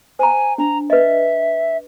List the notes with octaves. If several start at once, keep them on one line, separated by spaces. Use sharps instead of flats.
C5 G#5 A#5
D4 A#5
B4 D#5 E5